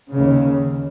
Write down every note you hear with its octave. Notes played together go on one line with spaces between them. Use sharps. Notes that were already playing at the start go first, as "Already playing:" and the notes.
D#2 C#3